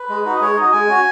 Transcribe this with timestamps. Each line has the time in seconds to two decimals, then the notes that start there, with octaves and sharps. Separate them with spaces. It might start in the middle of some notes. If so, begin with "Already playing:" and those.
Already playing: B4
0.09 G#3
0.26 D#4 F#4
0.36 D#5
0.41 G#3 C#5
0.57 D#4 F#4 D#5
0.72 G#3 G#5
0.89 C#4 F#4